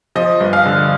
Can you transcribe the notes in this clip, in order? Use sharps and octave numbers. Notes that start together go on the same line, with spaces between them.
F3 D#5
G2
F5
D3